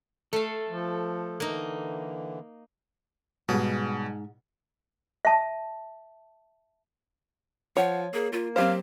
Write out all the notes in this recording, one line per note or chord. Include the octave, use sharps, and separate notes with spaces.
A3 A4 F5
F3
D3 E3 A#3 D#4
G#2 B2 G3 B3 C#4 G#4
E5 A5
F3 C#5 F#5
A#3 G#4
A#3 F4
F#3 C4 G4 C5 F5